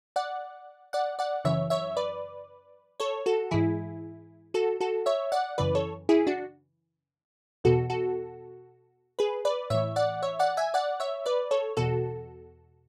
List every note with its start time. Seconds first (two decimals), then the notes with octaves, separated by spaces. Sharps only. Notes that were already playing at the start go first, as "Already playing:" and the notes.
0.16 D5 F#5
0.93 D5 F#5
1.19 D5 F#5
1.45 F#2 C#3 E3 C#5 E5
1.70 C#5 E5
1.97 B4 D5
3.00 A4 C#5
3.26 F#4 A4
3.51 G#2 E3 E4 G#4
4.54 F#4 A4
4.81 F#4 A4
5.06 C#5 E5
5.32 D5 F#5
5.58 F#2 C#3 E3 B4 D5
5.75 A4 C#5
6.09 E4 G#4
6.27 D4 F#4
7.64 E2 B2 F#4 A4
7.90 F#4 A4
9.19 G#4 B4
9.45 B4 D5
9.70 A2 E3 C#5 E5
9.96 D5 F#5
10.23 C#5 E5
10.39 D5 F#5
10.57 E5 G#5
10.74 D5 F#5
11.00 C#5 E5
11.26 B4 D5
11.51 A4 C#5
11.77 E2 B2 F#4 A4